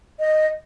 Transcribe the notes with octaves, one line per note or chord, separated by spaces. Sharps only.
D#5